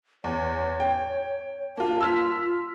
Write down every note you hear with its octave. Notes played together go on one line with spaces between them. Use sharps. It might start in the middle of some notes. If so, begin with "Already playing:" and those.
E2 C#5
G5
A#3 F4 A5
F4 E6 F6 B6